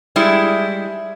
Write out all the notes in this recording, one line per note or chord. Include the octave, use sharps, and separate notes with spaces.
G3 G#3 E4